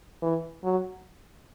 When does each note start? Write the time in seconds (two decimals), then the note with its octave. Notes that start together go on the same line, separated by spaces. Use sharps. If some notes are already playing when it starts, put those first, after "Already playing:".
0.22 E3
0.64 F#3